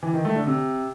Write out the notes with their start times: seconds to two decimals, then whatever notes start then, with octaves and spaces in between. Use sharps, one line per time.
0.03 E3
0.14 D#3
0.25 A3
0.36 D3
0.47 C3